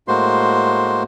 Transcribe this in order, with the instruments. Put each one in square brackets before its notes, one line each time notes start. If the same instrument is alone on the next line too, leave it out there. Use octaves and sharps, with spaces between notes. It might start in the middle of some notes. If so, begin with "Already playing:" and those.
[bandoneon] A2 G#3 A#3 F#4 C5 C6